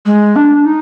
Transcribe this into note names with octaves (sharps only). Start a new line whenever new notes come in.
G#3
D4
D#4